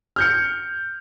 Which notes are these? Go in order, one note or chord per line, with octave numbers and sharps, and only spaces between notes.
F6 G6 C#7